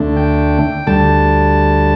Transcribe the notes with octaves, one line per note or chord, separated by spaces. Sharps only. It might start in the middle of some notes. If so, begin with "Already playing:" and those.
Already playing: D2 D3 A3 D4
G5
D2 D3 G3 A5